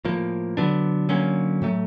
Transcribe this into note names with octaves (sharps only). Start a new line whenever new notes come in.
A2 F3 A#3
D3 F#3 B3 D4
D3 F#3 A#3 C#4
A2 F#3 A3